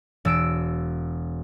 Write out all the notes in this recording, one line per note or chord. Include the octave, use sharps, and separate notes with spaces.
E1 E6 D7